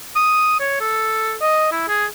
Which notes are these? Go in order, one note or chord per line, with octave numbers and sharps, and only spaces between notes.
D#6
C#5
A4
D#5
E4
G#4